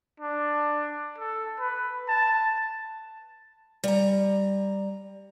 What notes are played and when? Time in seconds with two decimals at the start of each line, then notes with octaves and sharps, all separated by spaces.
0.20 D4
1.18 A4
1.60 B4
2.08 A5
3.84 G3 A#5